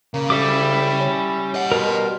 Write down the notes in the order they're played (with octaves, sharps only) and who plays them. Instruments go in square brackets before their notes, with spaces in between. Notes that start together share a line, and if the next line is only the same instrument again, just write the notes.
[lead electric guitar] C#3 [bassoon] A#3
[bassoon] D2 [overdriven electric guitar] G3 [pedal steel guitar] E4 E5 D6
[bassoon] C#4
[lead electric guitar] D#5 F#5
[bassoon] B2 [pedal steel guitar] A#4 C6